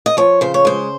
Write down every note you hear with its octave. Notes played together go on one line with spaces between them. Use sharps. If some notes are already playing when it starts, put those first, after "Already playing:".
D#5
F3 C#5
C#3 C5
C#5
G#3 C5